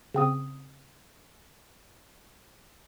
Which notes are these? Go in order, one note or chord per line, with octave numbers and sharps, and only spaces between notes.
C#3 C4 D#6